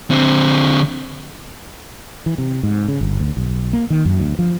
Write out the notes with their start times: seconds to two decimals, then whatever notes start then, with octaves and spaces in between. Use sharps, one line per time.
0.11 D3 C4
2.26 E3
2.38 C3
2.63 G#2
2.88 C#3
3.01 G1
3.20 D2
3.37 B1
3.73 A#3
3.90 D#3
4.05 F#2
4.20 D2
4.39 F3